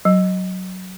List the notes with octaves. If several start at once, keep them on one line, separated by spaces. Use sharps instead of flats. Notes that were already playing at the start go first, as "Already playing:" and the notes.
F#3